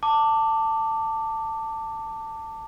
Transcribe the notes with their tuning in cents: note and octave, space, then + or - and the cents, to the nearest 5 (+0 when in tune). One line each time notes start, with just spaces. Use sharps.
A5 +20 D6 +0